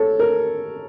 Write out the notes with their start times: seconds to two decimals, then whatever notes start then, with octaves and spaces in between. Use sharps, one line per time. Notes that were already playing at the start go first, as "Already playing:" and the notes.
Already playing: A4 C#5
0.19 A#4